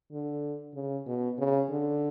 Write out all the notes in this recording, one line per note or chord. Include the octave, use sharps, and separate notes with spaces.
D3
C#3
B2
C#3
D3